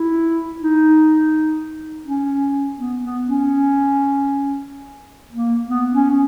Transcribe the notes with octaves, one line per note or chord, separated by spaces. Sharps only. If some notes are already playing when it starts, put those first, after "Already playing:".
Already playing: E4
D#4
C#4
B3
B3
C#4
A#3
B3
C#4